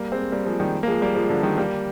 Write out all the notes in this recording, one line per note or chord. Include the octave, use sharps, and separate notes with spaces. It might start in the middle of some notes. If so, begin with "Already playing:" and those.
Already playing: G3 A#3
G#3 C4
G3 A#3
F3 G#3
D#3 G3
A#3
F3 G#3
G3 A#3
F3 G#3
D3 F3
D#3 G3
G3 A#3